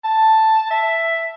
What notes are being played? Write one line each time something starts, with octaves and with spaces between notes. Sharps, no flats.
A5
E5